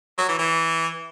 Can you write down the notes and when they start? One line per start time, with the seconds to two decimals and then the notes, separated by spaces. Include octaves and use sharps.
0.18 F#3
0.29 E3
0.39 E3